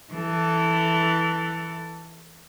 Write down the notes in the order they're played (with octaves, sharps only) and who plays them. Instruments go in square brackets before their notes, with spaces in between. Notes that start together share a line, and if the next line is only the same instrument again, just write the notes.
[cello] E3 A4